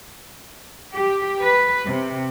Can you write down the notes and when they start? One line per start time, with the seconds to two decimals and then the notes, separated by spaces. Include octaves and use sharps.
0.94 G4
1.41 B4
1.86 C3